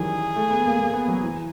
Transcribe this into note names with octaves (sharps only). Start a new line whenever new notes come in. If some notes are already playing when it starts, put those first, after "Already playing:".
Already playing: D#3 E3 F#3 G3 G#4
A3
B3
A#3
A#3
B3
F#3
E3